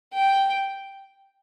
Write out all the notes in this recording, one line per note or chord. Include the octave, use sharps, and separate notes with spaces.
G5